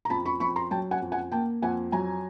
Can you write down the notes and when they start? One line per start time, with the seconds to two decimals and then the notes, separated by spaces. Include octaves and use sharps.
0.05 A#5
0.10 F2 A5 B5
0.26 B5 C#6
0.40 F2 B5 C#6
0.56 A#5 C6
0.71 F#3 G5 A5
0.91 F#5 G#5
1.02 F2
1.12 F#5 G#5
1.32 A#3 G5 A5
1.62 F2 F#5 G#5
1.92 F#3 G#5 A#5